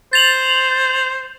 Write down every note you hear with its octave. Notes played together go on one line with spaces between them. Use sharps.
C5 A6 F7 F#7